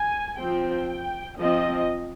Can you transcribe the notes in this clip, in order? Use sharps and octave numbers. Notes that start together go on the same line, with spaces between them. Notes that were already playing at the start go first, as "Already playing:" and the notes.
Already playing: G#5
F3 C4 G5
F3 C4 D#5